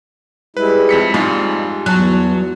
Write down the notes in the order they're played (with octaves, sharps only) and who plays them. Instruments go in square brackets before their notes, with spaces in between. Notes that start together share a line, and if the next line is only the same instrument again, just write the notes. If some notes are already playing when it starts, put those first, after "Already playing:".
[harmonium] G3 G#3 E4 [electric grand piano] B4
[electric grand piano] F2 B6 C#7
[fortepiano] G#2 [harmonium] G3 [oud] F4
[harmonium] E2 [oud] F#3 [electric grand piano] A5 F#6